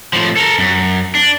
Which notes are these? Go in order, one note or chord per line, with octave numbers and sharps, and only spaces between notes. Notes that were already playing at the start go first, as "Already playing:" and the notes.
A2 F3
A4 A#4
F#2
D4